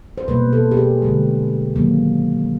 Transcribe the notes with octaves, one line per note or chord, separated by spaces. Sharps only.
C5
B2 G3 A#3 B4
A4
G4
G#4
D3 F3 G#3
D#3 F#3 A#3